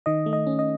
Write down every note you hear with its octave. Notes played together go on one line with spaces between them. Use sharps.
D#3 D#5
A3
D#5
C#4
D#5